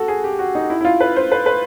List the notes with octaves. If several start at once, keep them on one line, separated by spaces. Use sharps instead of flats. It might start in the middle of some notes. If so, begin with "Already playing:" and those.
Already playing: F#4 A4
G#4
G4
F#4
D#4
E4
E4
F4
B4
C5
B4
B4